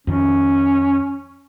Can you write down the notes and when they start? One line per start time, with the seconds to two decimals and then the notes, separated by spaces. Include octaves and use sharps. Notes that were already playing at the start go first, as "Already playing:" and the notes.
0.07 F2 D#3 C#4